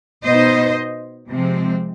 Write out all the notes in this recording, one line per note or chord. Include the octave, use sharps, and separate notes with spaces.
B2 B3 D#4 C5 D#5
C3 F3 G#3 C4